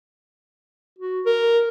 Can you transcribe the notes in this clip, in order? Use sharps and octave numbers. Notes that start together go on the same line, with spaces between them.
F#4
A#4